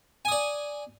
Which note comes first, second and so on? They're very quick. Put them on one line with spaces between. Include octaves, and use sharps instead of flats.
G#5 D#6 D5